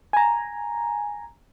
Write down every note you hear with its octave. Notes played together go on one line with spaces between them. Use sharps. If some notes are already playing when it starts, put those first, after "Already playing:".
G#5 A#5